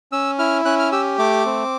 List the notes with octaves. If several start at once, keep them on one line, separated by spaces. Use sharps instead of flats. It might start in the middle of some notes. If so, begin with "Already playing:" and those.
C#4 E6
E4 F6
C#4 F#6
F6
G4 E6
A3 D6
C4